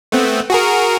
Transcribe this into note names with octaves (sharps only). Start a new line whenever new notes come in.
A3 B3 C4
F#4 G#4 A#4